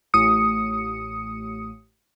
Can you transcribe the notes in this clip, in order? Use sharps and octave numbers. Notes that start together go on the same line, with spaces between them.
A1 D#6 C#7